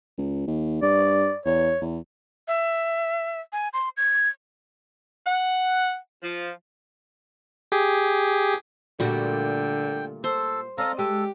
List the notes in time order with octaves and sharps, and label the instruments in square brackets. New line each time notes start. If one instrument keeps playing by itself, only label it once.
[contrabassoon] C#2
D#2
[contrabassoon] G2 [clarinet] D5
[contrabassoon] E2 [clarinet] C#5
[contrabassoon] E2
[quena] E5
G#5
C6
G#6
[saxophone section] F#5
F3
[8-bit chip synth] G4 G#4
[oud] A#2 A3 [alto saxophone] D3 [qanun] G3 F#4 [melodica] G5
[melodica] A4 [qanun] C5
[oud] C4 D5 D#5 [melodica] A4 F5 A#5
[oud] G#3 [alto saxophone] G4 [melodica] A4